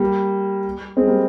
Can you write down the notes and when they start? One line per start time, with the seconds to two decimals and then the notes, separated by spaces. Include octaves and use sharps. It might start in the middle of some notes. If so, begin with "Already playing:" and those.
Already playing: G3 A#3
0.97 G#3 C4
1.07 G3 A#3